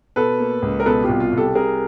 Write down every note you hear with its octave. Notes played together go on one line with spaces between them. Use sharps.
B2 A4 B4
A#3
C#2
A#4
B2 A4 B4
F4 G4
C2
F4
C2
G4 A4
C3 G#4 A#4